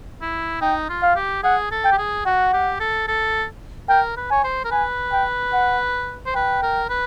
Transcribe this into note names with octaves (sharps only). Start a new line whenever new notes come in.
E4
D#4 G5
F4
F5
G4
G#4 F#5
A4
G5
G4
G#4
F#4 F#5
G4
A4
A4
A#4 G5
B4
C#5 G#5
C5
A#4
B4 G#5
G5
F#5
C5
B4 G5
A#4
B4